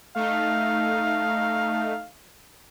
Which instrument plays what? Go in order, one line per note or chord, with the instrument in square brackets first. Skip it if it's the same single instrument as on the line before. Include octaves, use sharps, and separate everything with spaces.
[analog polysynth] A3 D#4 [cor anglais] F5